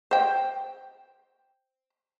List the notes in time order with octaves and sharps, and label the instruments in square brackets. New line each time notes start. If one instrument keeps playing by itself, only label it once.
[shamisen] C5 G5